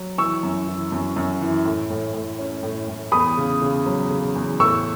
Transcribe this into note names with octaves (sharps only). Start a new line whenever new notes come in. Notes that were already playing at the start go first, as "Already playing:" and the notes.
Already playing: F#3
E3 C#6 E6
F#2
E3
F#2
F#2
E3
A2
A2
A2
C#4
A2
A2
E2 B5 D#6
C#3
C#3
F#3
C#3
E2
A2 C#6 E6